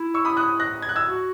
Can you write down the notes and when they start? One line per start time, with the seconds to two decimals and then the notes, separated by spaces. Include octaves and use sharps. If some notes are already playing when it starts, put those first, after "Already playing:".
Already playing: E4
0.14 C#6 E6
0.25 B5 D#6
0.37 D#6 F#6
0.60 F#6 A#6
0.82 G#6
0.89 F#6
0.96 E6 G#6
1.05 F#4